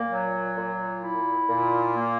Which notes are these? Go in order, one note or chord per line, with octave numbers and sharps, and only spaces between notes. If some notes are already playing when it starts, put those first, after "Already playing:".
Already playing: A#2 A#3
F#3
A#2
E4
A#2
A#3